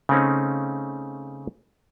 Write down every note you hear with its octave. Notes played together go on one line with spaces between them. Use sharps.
C#3 A3 C4 C#4 D#4